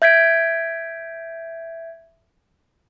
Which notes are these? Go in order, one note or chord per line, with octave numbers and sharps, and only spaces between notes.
E5 G6 G#6 B6 D7